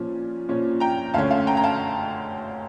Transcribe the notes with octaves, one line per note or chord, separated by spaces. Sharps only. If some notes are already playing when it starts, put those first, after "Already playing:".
Already playing: A#2 F3 C#4
A#2 F3 C#4
G5 A#5
D2 D3 A3 C#4 F5 A5
F5 A5
G5 A#5
A#5
F5 A5